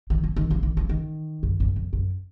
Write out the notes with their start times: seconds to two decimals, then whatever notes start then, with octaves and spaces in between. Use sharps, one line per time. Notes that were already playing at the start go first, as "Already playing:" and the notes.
0.10 D#3
0.23 F3
0.36 D#3
0.51 F3
0.63 D#3
0.77 F3
0.89 D#3
1.43 F#2
1.60 F#2
1.76 F2
1.93 F#2